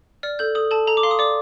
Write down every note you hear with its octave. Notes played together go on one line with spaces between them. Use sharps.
D5 F6
A4 G6
A4 D#6
A4 A5
A4 A#5
D6
F5 C6
D#6
D5 D6